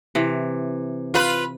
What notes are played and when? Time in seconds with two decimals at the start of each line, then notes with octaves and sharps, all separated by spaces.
0.15 C3 E3
1.14 F4 B4